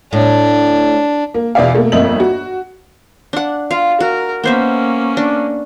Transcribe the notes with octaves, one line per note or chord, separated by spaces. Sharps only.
A2 D4
A#3
E2 B2 B3 D5 E5 F5
B2 A3 A#3
G1 F2 A#3 D#5 E5 F#7
F#4
D4 F#5
F4 F5
F#4 A#4
A#3 B3 C#4 C5 E5
D4